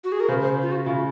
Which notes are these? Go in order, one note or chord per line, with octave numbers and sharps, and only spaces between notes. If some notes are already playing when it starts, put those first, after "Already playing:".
F#4
G#4
A#4
C#3 C5
C5
F4
F#4
C#3 F4